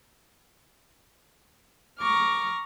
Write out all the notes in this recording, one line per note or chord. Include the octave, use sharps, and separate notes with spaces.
A#5 C#6 D6 F6